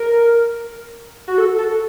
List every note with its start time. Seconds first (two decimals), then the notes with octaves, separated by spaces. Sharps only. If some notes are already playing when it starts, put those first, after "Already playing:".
Already playing: A#4
1.28 F#4
1.38 A4
1.58 A4